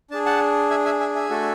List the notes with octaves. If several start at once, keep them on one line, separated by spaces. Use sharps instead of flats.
D4 G#4 A5
F#5 A5
E5 G#5
E5 G#5
E5 G#5
E5 G#5
A3 D4 F#4 A4